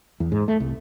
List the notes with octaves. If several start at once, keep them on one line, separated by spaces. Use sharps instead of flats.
E2
G#2
A3
C2